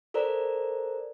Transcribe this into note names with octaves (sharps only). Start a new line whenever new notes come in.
A4 A#4 C5 D5 A#5